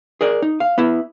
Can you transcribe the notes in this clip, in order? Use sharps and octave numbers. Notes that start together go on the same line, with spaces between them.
G#4 A#4 D5
D#4
F5
B3 E4